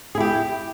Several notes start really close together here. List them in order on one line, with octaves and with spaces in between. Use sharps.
G#4 E4 G4